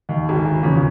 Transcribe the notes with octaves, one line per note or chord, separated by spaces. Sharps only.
D#2
G#1 D2
E2 A#2 C#3 F3